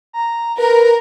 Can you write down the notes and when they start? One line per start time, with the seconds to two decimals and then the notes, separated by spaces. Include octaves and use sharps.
0.13 A#5
0.58 A#4 B4